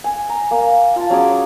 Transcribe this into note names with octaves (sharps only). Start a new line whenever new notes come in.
G#5
A#5
A#3
F4 A5
F#3 C#4 G#4 D6